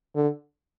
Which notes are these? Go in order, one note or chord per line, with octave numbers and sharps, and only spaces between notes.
D3